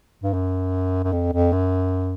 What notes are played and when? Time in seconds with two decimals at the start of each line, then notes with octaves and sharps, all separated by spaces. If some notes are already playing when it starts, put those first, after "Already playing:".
0.23 G2
0.33 F#2
1.03 F#2
1.12 F2
1.32 F2
1.52 F#2